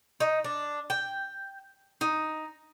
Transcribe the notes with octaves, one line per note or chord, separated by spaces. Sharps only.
D#4
D4
G5
D#4